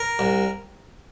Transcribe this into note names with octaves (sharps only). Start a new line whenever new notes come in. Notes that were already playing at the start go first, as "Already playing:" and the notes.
Already playing: A#4
C2